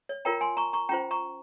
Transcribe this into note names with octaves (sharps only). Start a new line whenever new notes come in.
C#5
F4 A#4 C#5 G5 A#5
G#5 C6
A#5 C#6
A#5 C#6
C#4 F4 C5 G5 A#5
A#5 C#6